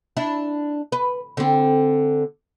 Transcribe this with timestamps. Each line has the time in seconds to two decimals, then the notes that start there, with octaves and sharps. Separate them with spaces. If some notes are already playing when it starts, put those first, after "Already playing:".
0.17 D4 E4
0.92 B4
1.37 D3 C4